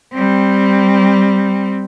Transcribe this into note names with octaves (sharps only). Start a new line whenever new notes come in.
G3 C4